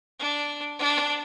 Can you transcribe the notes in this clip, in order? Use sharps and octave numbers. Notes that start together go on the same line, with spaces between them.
D4
D4